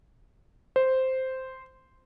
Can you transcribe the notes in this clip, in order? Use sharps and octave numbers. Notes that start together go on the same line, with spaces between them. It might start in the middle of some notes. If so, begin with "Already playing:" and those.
C5